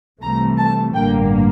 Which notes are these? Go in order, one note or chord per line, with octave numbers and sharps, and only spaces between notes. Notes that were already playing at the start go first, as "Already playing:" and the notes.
C2 C3 E3 A3 A#5
A5
A1 G2 D3 G3 A#3 G5